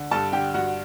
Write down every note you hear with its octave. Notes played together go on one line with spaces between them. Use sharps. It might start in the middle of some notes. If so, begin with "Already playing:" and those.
Already playing: D3
G2 A4 A5
D3 G4 G5
G2 F#4 F#5